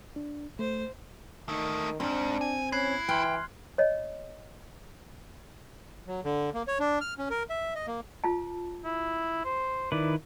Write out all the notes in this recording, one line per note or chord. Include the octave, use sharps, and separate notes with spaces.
D4
A3 C5
D#3 A3 D#4
C#2 G#2 C4 D4
G#5
C#4 E4 F#6 G#6 C7
E3 G5 C6 F6 F#6
C#5 D#5
F#3
D3
A#3
C#5
D4
F6
C#4
A#4
E5
D#5
A#3
F4 A5
E4
C5
D#3 E4 B4 D5